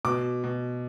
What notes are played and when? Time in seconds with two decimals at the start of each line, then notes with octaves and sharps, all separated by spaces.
0.05 B2 D6
0.44 B2